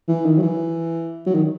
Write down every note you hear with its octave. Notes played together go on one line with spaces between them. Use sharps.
E3
D#3
F#3
E3
F#3
D#3